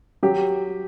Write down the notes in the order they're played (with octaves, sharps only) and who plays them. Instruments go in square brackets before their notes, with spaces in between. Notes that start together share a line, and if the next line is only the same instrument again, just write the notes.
[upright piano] F#3 G4